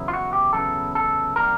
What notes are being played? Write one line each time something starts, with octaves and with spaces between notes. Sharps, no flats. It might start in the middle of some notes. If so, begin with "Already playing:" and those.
Already playing: E2 C#3 F#3 B3 E4
F4
F#4
G4
E2 C#3 F#3 B3 E4 A4
A4
C3 D#3 G3 A#3 A#4